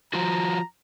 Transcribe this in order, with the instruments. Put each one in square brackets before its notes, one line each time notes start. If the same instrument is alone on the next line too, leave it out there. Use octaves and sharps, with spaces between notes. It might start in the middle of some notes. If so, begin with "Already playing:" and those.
[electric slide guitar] F3 F4 F#4 [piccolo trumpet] A#5